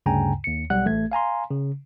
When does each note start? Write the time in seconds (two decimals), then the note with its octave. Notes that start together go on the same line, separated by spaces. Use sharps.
0.06 D2 G2 C#3 G5 G#5 A#5
0.44 D#2 C#7
0.70 B1 G3 F#5 F#6
0.85 A1 A3 G#6
1.12 F5 G#5 A#5 C6
1.50 C#3